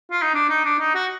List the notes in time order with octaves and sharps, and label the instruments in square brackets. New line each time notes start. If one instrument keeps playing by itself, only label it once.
[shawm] F4
D#4
D4
D#4
D4
D#4
F#4